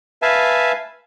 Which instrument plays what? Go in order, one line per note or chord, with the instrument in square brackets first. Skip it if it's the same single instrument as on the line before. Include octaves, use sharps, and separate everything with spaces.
[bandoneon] B4 E5 F5 G#5 A5